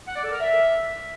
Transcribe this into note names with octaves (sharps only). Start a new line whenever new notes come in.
F#5
D5
A4
A#4
E5